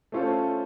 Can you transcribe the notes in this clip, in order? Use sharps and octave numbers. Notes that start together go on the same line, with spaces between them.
A3 C#4 F4 A4 C5